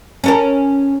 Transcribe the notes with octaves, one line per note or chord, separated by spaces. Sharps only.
C#4 A4 A#4